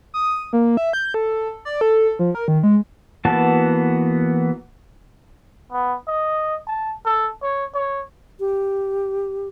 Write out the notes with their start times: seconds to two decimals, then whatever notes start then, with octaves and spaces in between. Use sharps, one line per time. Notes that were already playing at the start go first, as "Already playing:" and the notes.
0.14 D#6
0.53 A#3
0.77 E5
0.93 G6
1.14 A4
1.65 D5
1.81 A4
2.19 F3
2.35 A#4
2.48 D#3
2.63 G#3
3.25 E3 A#3 B3 F#4 A5
5.72 B3
6.08 D#5
6.67 A5
7.05 A4
7.43 C#5
7.74 C#5
8.40 G4